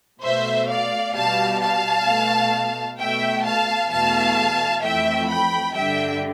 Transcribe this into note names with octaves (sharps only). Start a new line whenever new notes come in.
B2 A3 C5 E5
D5 F5
B2 G3 F5 A5
F5 A5
B2 A3
B2 A3 E5 G5
F5 A5
E2 B2 A3 F5 A5
F2 E3 A3 E5 G5
G5 B5
G2 D3 G3 E5 G5